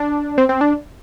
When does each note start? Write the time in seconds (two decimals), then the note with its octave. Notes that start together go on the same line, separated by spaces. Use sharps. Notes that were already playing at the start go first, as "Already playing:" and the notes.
Already playing: D4
0.38 C4
0.49 C4
0.61 D4